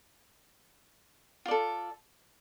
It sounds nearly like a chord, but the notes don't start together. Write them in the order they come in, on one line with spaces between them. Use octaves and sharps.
F4 D5 A4